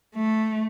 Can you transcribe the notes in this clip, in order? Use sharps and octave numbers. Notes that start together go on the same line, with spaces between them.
A3